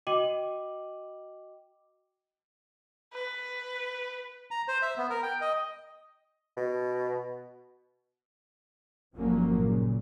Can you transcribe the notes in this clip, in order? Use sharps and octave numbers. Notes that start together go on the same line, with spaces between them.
F#4 D#5 G5 D6 D#7 F#7
B4
A#5
C5
E5
B3
A#4
G5
D#5
B2
G1 G2 F3 F#3 A#3 C#4
A#2 C#3